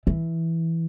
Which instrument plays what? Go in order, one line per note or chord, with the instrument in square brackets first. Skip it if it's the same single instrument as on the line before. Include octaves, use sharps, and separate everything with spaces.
[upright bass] E3